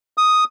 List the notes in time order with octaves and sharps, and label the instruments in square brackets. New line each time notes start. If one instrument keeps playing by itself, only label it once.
[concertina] D#6